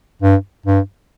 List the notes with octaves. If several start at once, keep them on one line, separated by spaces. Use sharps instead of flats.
G2
G2